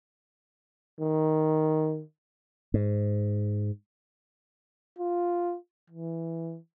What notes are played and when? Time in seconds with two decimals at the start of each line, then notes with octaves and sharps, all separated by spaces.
1.00 D#3
2.74 G#2
4.99 F4
5.90 E3